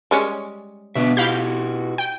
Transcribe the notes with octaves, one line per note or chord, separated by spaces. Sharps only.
G3 G#3 C#4
B2 B3 D4 E5
E4 F#4 G4 F5 B5 G6
G5